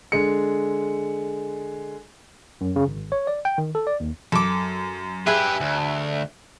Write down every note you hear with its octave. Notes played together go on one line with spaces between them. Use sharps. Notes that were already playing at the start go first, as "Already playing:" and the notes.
D3 G#3 C#7
F#2
C#3
G#1
C#5
D5
G5
D#3
A4
D5
D#2
F#2 A4 D6
G4 G#4 B4 E5 G#5
D2